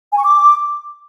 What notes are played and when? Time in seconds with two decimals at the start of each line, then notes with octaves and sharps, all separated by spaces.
0.12 G#5
0.18 C#6
0.24 D6